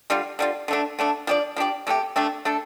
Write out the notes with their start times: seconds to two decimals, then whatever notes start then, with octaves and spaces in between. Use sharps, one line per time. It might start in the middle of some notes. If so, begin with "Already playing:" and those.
0.10 D3 G3 F4
0.39 D3 G3 F4
0.68 D3 A3 D4
0.99 D3 A3 D4
1.27 F3 D4 G4 D5
1.56 F3 D4 G4 D5
1.87 C3 A3 D4 G4
2.16 C3 A3 D4 G4
2.45 A3 D4 A4